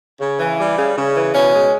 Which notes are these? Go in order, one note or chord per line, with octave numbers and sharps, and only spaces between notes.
C#3
E3
G3
C#3
C#3
E3
B2 C#4
G#3